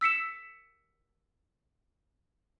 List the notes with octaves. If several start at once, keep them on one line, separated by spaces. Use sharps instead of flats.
E6 B6 C#7 E7